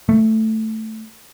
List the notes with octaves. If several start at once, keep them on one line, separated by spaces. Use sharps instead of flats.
A3